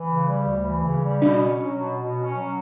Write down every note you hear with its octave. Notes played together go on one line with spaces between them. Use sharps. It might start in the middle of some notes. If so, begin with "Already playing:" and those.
Already playing: E3
C#3
G3
D2
E3
C#3
G3
B2 D4
C#4
F#3
B2
B2
C#4
F#3